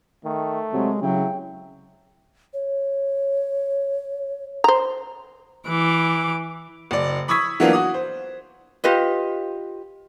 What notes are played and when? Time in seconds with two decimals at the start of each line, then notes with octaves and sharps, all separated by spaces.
0.25 D#3 A3
0.73 C3 F#3 G#3
1.02 C#3 F#3 E4 G5
2.54 C#5
4.64 C5 A#5
5.68 E3 D6
6.91 F#1 D5
7.28 B5 C#6 D#6 E6 G#6 B6
7.60 E3 F#3 A#3 B3 D4 F4
7.73 F#4 D#6
7.94 C5
8.84 F4 G4 B4 D#5